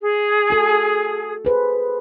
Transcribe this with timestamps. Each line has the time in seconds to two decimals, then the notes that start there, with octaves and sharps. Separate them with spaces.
0.02 G#4
0.50 F#4 A4
1.45 G#4 B4 C5